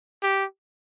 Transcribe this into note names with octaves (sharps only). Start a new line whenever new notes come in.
G4